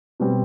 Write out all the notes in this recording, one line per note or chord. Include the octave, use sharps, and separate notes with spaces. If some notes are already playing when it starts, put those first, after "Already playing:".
B2 G3 C4